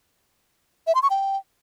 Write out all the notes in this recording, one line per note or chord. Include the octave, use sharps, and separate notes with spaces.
E5
C6
C#6
G5